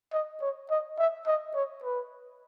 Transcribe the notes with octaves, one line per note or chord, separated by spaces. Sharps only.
D#5
C#5
D#5
E5
D#5
C#5
B4